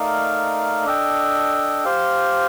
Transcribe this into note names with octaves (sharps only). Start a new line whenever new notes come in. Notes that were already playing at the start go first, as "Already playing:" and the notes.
Already playing: A3 D#4 A#4 D5 F5
D4 A4 D#5 G5
G4 C5 F5